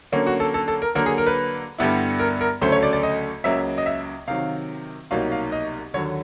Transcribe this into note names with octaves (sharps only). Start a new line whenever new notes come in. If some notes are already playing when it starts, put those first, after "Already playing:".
D3 F#3 A#3 C#4
F#4
A4
A4
A4
A#4
D3 F#3 A#3 A#4
G#4
A#4
B4
G2 D3 G3 B3 E4
A#4
A#4
D2 C#3 F#3 A3 C5
C#5
D5
D5
D#5
C#2 C#3 F#3 A#3 E5
D#5
E5
C3 D#3 F#3 F5
C2 B2 F#3 A#3 D#4 F5
F5
D#5
D#2 D3 F#3 C#5